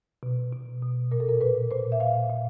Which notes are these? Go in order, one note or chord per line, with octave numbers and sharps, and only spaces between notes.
B2
B2
B2
A#2 A#4
A4
A#4
A#2 B4
A#2 C5
E5
A#2 F5
A#2